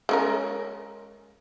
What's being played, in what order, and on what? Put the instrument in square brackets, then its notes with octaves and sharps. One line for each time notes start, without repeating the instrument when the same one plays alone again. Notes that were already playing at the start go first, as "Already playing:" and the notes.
[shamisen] G#3 C#4 A#4